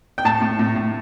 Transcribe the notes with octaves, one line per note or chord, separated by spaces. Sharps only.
G5
A2 A5
A2
A2
A2